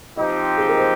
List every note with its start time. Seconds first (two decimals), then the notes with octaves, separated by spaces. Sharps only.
0.17 F3 C4 D#4 G4 D#5
0.58 G#4
0.69 A#4
0.79 C5